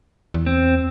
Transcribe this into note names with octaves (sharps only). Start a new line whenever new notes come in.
E2
C4